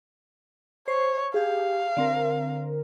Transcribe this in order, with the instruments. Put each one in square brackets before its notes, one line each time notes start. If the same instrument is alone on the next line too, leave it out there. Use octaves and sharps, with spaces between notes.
[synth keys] C5 [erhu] C#5
[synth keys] G4 G#4 [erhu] F5
[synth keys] D3 C4 A#4